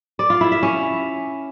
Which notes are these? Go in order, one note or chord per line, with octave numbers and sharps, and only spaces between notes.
D5
F4
E4
E5
C#4